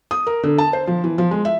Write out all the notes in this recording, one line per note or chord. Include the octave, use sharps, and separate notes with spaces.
D#6
A#4
D3
A5
C5
F3
E3
F3
G#3
E5